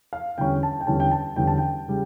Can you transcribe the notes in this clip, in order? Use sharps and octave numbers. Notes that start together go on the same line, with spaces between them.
F5
E2 D3 G3 C#4 G5
A5
G5
E2 D3 G3 C#4 A5
G5
A5
E2 D3 G3 C#4 G5
A5
G5
C#3 G3